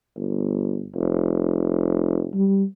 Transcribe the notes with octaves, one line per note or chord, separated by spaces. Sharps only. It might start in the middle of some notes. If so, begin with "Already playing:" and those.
G1
F1
G3